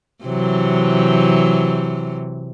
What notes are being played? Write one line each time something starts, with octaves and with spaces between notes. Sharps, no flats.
C3 E3 F#3